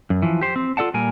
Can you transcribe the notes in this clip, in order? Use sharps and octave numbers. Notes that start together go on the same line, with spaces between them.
F#2
E3 F3
G4 C5
C4
F4 A4 D5 F#5 A5
A#2 G3 A#4 G#5